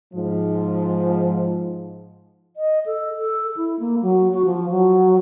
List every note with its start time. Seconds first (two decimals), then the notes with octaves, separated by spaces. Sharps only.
0.14 G#2 F3
2.56 D#5
2.86 A4
3.17 A4
3.56 E4
3.79 A#3
4.02 F#3
4.34 F#4
4.45 F3
4.71 F#3